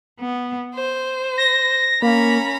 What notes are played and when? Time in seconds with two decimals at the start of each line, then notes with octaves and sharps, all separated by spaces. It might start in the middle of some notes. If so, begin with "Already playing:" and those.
0.20 B3
0.74 C5
1.38 A#6
2.02 A#3 C#4 A#5 B5